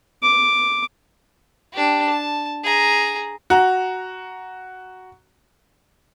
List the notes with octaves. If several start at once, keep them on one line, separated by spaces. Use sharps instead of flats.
D6
D4 G4
A5
G#4 A#5
F#4 A#5